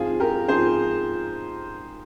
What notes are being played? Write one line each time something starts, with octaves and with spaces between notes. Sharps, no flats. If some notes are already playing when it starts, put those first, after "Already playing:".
Already playing: G#2 F3 C4 F4 G#4
G4 A#4
G#2 F3 C4 G#4 C5